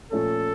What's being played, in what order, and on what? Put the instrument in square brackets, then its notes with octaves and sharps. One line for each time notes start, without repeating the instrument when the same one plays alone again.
[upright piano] A#2 F3 A3 C#4 [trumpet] A4